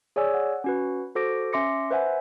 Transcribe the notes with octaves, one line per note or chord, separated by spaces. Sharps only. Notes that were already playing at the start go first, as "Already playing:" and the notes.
G#4 C#5 D5 G#5 E6
F#5
C#4 F#4 B4
F#4 A4 C5 D6 A#6 D7
C#4 E5 C6 D6 A#6 C#7
B4 C5 E5 F#5 G#5